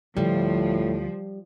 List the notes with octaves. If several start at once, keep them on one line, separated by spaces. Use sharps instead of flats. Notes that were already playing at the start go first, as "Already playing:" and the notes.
D2 A2 D3 F3 G3